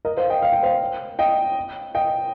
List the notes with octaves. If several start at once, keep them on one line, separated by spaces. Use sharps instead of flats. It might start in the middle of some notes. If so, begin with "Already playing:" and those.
A#4 D#5
C5 F5
D#5 G5
F5
G5
C5 F5
D#5 G5
D#5 G5